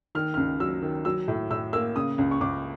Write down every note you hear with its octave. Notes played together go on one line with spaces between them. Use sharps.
D#3 F6
C#2 F6
F#3 E6
D#3
F#3 E6
A2
A2 E6
A#3 E6
C#3 D#6
C#2
C#6
C#2 D6